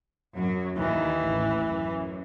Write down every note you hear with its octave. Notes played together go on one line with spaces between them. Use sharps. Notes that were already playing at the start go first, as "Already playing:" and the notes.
F#2 F#3
D#2 D#3 E3
A1 A2
F#2